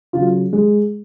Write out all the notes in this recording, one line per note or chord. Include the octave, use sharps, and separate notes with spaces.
C#3 F#3 F4
G#3